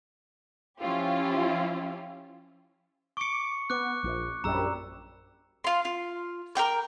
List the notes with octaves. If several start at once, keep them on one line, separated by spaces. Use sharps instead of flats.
F3 C#4 E4 F4 G4
C#6 D6 C#7
B3 D6 F#6
A#1
A#1 F#2 G3 A#5 E6
F4 C6
F4
A#4 C5 G5 D6